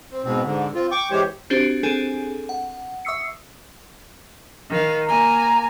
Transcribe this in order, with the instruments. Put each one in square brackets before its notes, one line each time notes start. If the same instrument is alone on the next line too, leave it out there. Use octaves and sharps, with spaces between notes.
[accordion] C4
G#2 B2 C4
G#2 D3
C4 F4
G5 C#6 D6
E3 G#3 G4 C5 C#5
[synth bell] C4 D4 F#4 G4 C5
C4 D4 G#4 A4 G#5
F#5
E5 C#6 D#6 E6 C7 C#7
[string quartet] D#3 F5
[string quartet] A#3 G#5 [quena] A#5